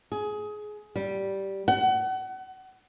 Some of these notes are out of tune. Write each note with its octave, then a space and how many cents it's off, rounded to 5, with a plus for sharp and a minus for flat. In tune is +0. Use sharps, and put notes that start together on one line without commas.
G#4 +20
G3 -10
F#5 +30